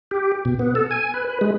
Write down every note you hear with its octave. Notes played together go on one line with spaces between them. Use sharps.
G4
B2
B3
A4
G#5
B4
B4
G#3